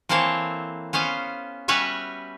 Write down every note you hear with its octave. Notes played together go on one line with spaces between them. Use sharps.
E3 A#3 C4 A4 C5 C#5
B3 C#4 C5 F5
G3 C#4 F#4 B4 C#5 E5